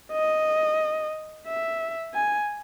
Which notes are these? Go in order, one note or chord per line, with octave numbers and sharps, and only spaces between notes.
D#5
E5
G#5